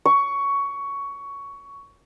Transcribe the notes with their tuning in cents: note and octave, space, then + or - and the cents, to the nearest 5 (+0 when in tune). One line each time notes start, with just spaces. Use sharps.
C#6 +15